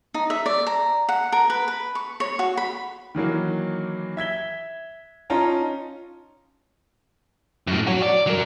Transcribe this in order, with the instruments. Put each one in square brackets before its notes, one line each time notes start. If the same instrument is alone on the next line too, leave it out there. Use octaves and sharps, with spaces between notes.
[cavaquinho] D#4
E5
D5
A#5
F#5
A#4
B4
B4
C#6
C#5
F#4
B5
[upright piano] D#3 E3 F#3 A#3
E5 G#6 B6 G7
C#4 D#4 F4 A5 A#5
[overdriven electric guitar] F#2 A2
F#4 C#5
D5
F#3 A#4